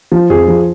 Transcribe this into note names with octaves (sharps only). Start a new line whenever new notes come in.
F3
F2 G#4
F3